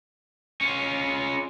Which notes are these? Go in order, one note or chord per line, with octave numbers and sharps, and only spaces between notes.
C#4 F4